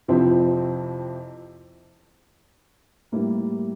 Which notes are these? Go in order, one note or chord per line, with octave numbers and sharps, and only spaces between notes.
F2 C3 F3 C4 E4
A2 G3 A#3 E4